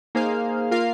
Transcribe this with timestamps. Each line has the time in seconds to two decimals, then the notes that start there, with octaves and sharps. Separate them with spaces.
0.15 A#3 D#4 G#4 C5 F5
0.71 A#3 F4 A#4 F5